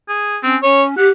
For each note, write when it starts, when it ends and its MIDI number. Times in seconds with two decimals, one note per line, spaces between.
0.09 0.37 68
0.43 0.57 60
0.43 0.60 61
0.63 0.97 61
0.63 0.84 73
0.97 1.08 67
0.97 1.10 78